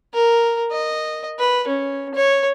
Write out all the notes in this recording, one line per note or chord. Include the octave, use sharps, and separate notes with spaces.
A#4
D#5
B4
C#4
C#5